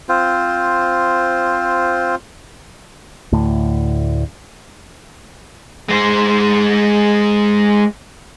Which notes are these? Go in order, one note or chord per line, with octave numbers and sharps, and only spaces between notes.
C4 F4 C5
D2 A2
G#3 C5